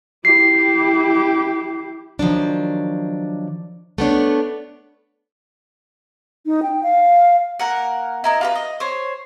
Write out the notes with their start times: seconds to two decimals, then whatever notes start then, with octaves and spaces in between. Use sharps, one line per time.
0.25 E4 G4 C7
2.19 D#3 F3 F#3 D4
3.98 A3 B3 D4 C#5
6.46 D#4
6.63 G5
6.83 F5
7.59 A#3 A#4 F#5
8.24 E4 A#4 D#5
8.41 F4 G4 B4
8.55 D#5
8.80 C5 C#5